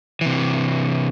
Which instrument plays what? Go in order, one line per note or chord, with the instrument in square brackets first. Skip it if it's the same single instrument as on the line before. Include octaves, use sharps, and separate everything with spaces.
[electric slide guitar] C3 E3